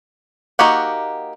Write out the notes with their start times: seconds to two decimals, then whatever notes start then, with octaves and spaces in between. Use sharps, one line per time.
0.59 A#3 D#4 F#4 G4 F#5